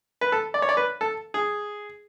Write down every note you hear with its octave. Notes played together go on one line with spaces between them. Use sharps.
B4
A4
D5
C#5
D5
B4
A4
G#4